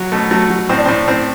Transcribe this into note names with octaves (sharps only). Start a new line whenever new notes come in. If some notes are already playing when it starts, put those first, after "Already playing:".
Already playing: F#3
B2 A3
F#3 A3
F#3
A2 C4
D4
C4
A2
A2 C4